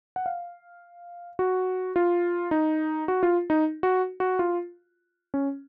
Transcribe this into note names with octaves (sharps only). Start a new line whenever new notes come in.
F#5
F5
F#4
F4
D#4
F#4
F4
D#4
F#4
F#4
F4
C#4